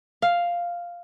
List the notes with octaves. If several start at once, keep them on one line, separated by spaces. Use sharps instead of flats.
F5